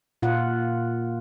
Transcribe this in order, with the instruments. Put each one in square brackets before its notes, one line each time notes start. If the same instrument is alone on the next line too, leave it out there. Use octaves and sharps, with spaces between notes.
[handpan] A#2 F4 F#5